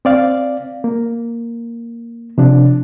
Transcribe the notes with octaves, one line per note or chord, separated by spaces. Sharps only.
C4 D5 F5
A#3
C3 F3 D4